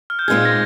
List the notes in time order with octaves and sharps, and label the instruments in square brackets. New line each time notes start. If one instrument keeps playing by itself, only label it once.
[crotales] F6
G6
[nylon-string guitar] A#2 G#3 C4 D#4 G#4 [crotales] G#6
[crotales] A#6